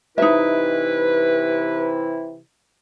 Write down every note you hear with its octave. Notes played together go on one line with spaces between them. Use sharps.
C3 E3 D#4 E4 B4 E5